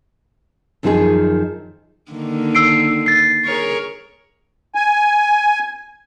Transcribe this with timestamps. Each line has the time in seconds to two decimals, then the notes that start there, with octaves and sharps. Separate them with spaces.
0.83 F#2 D#3 F3 D#4 F4 G#4
2.11 D3 D#3 A#3
2.55 E6 C7 D7
3.06 A6 C7
3.45 G#4 A#4 C#5
4.75 G#5